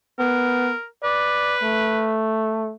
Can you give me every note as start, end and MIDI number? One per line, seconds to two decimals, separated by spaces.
0.19 0.73 59
0.19 0.86 70
1.04 2.19 71
1.04 1.57 74
1.63 2.74 57